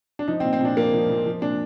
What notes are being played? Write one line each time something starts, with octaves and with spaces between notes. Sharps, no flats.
D4
F3 D#4
C4
A#2
C4
A#2 D4
F3 A#3
F3
A#2
F3
A#2 D4